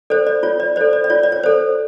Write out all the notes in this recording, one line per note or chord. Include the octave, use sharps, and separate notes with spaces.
A4 C5 D5
D5
F4 C#5
D5
A4 C5 D5
D5
D5
F4 C#5
D5
C#5
A4 C5